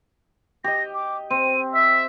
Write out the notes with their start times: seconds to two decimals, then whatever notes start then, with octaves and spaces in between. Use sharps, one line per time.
0.64 G4 D#5 A#6
0.94 D6
1.31 C4 D#7
1.74 E5 E6